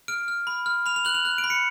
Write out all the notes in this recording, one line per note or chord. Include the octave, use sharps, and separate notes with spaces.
F6 D7
F6
B5
F6
B5 F7
F7
F#6 F#7
F7
F#6
D7
B5
C#7